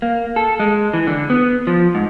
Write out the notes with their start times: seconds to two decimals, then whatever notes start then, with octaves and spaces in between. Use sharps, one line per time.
0.02 A#3
0.36 A4
0.60 G#3
0.93 E3
1.07 D3
1.30 B3
1.67 F3
1.95 G#2